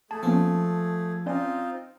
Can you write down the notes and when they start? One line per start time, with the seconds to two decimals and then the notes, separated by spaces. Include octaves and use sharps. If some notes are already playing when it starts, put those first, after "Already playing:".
0.11 A3 G#4 A5
0.23 F3 A#3 B3 C#4
1.26 C4 C#4 D#4 F4 D5 G#5